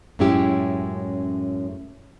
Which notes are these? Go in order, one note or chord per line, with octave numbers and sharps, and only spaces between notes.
F#2 A2 G#3 C#4 E4 G4